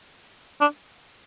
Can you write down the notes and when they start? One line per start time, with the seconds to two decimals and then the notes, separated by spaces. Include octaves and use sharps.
0.61 D4